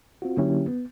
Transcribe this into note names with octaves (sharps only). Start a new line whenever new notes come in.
C4 F4 F#4
D3 F#3 A#3 C#4 E4 G4
B3